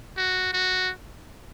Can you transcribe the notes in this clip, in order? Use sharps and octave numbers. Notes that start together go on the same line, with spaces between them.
F#4
F#4